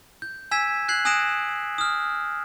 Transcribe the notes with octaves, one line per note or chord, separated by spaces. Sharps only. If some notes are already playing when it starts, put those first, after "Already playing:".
G6
G#5 E6 G#6 B6 E7
F#6 G#6 C7 F#7
G#5 D#6 F#6 A#6 D7 E7
D#6 F6